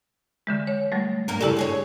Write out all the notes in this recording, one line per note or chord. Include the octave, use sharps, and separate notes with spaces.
D3 E3 G#3
C#5
F#3 G3 A3
G2 A#3 A#4
F#2 C#3 E4 G4 A4 D5
G2 G#4 C#5